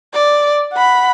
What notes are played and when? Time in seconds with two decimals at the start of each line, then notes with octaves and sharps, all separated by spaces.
0.14 D5
0.73 F#5 B5